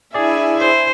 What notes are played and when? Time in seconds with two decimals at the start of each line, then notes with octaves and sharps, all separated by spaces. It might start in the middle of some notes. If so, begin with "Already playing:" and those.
0.14 D4 E4 G#4 D5 E5 G#5
0.57 C5